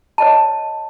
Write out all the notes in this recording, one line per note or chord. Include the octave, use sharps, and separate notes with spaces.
C#5 D#5 A5